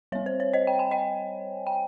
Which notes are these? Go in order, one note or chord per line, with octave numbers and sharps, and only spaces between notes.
G3 C4 C#5
C5
C#5
C5 D#5
G5
G#5
D#5 G5
G5